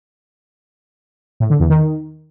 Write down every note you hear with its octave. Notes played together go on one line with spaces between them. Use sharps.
A2
D3
E2
D#3